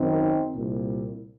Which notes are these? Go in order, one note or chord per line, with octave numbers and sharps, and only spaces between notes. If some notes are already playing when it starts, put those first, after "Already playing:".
Already playing: F#2 D#3 C4 D#4
C2 A#2